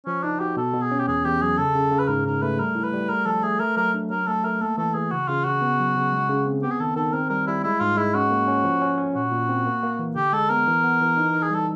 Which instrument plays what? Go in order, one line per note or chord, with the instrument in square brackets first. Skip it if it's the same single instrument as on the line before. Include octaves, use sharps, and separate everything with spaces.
[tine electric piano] F3 [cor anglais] C#4
[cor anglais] D4 [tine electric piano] D#4
[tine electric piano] F#4 [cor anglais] G4
[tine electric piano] B2 [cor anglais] A4
[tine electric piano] B2
[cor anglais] G#4
[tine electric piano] C#4
[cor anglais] G4
[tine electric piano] E2 [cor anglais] G#4
[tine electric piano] E2 [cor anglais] G4
[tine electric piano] F#3 [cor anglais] G#4
[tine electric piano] C#3 [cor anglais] A4
[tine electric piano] C#3
C#3
[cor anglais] B4
[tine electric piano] G#2 [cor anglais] A#4
[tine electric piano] G#2 [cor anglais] A#4
[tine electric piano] A3 [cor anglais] B4
[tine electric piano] G3 [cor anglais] A#4
[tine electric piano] E4
[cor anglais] B4
[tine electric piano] G3
[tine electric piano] A3 [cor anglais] A#4
[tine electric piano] F3 [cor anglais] A4
[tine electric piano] A3 [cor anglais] G#4
[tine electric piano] A3 [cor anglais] A#4
[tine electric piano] F#3 [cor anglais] A#4
[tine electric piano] D4
[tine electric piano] F#3 [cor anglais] A#4
[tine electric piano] A3 [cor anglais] A4
[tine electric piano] A3 [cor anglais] A#4
[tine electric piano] A#3 [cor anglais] A4
[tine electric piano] E3 [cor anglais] A4
[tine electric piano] E3 [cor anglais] G#4
[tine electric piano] C#3 [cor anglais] F#4
[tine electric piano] C#3 [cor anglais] F4
[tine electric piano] C#3 [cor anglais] F#4
[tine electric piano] B3
F#3
C#3
G#3
C#3
C4
[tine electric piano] B3 [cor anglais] G4
[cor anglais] G#4
[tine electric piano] D#3 [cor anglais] A4
[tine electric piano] D#3 [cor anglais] A4
[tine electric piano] C4 [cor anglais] A#4
[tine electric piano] G3 [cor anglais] A#4
[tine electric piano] G3 [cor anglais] E4
[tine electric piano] G#3 [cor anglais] E4
[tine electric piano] G#2 [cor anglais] F4
[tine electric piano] G#3 [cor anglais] E4
[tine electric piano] C#4 [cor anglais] F#4
[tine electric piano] A#3
C#4
F3
C#4
C#4
[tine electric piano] A#2 [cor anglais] F#4
[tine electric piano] A#2
C4
A#3
A#3
E3
[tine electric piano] D3 [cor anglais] G4
[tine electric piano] G#3 [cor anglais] A4
[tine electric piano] B3 [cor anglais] A#4
[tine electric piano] E3
B3
E3
D#4
D#4
[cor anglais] G#4
[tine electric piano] G3 [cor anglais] A4